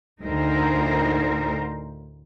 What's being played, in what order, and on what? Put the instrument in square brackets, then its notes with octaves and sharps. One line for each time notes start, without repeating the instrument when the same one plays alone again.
[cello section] D2 A2 D#4 A#4 C5